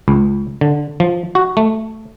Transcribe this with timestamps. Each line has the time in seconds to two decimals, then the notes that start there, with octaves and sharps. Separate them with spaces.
0.08 C#2
0.61 D3
1.00 F3
1.35 F#4
1.57 A3